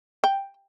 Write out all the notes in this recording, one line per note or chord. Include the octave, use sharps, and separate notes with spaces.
G5